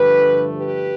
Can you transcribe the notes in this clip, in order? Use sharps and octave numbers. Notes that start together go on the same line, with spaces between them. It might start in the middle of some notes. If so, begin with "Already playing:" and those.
Already playing: G2 D3 F3 A3 G4 B4
G4 B4